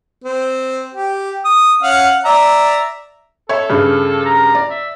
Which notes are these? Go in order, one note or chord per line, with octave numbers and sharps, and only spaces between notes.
C4
G4
D#6
C#4 F5 F#5
D5 E5 A#5
A4 C#5 E5
G2 C#3
A#5
D5
E5